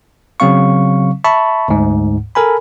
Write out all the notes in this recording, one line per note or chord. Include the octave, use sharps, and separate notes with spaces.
C#3 F#3 C4 F5 C#6
E5 A5 B5 C#6
D2 G#2
A4 A#4 G#5 B5